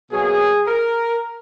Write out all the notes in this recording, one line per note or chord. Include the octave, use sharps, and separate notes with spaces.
B2 F#3 A#3 G#4
A#4